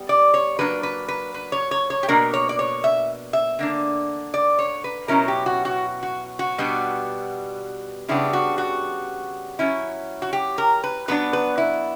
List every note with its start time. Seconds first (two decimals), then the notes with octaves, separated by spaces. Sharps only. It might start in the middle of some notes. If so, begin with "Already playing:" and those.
Already playing: G3 B3
0.09 D5
0.34 C#5
0.59 F#3 A#3 D4 B4
0.83 B4
1.08 B4
1.34 B4
1.52 C#5
1.71 C#5
1.90 C#5
2.03 G4
2.08 B2 A#3 D4 A#4
2.33 C#5
2.49 D5
2.59 C#5
2.84 E5
3.33 E5
3.59 D3 A#3 D4
4.34 D5
4.59 C#5
4.84 B4
5.08 B2 F#3 C#4 E4 A#4
5.28 G4
5.46 F#4
5.65 F#4
6.03 F#4
6.39 F#4
6.58 B2 G3 B3 D4
8.09 C#3 G3 B3 D4 E4
8.33 F#4
8.58 F#4
9.59 F#3 C#4 E4
10.22 F#4
10.33 G4
10.58 A#4
10.84 B4
11.08 F#3 B3 D4 B4
11.33 B4
11.58 E4